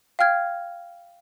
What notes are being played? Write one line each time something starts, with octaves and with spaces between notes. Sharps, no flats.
F5 G5 F6 G#6